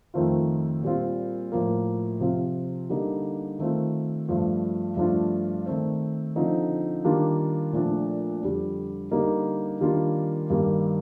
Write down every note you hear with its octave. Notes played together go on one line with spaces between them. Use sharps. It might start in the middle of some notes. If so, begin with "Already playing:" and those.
F2 D#3 A3 C4 F4
A#2 G3 C4 F4
A2 F3 A#3
C3 F3 C4 F4
D3 G3 A#3 D#4
D#3 A3 C4 F4
G2 F3 A3
G2 F3 A3 D4 F4
D#3 A3 C4
D3 F3 C4 D#4
D#3 G3 A#3 D4 F4
A#2 F3 A3 D4
F2 D3 G3
D3 G3 A#3 D#4
D#3 G3 A#3 D4 F4
G2 D#3 G3 A#3